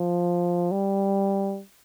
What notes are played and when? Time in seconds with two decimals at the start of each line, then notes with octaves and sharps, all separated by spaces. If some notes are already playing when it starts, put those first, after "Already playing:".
Already playing: F3
0.72 G3